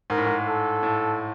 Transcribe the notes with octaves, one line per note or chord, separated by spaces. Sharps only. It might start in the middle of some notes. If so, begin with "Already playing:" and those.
G#2 A#4
A2
G#2
A4
A2